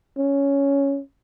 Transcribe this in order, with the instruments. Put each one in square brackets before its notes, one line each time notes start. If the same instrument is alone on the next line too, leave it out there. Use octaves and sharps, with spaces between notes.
[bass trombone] C#4